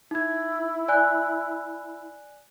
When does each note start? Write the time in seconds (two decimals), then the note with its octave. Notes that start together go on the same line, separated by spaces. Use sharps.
0.11 D#4 E4 G#6
0.88 D5 G#5 F#6